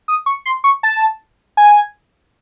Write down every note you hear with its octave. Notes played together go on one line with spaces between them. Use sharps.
D#6
C#6
C6
C#6
A5
G#5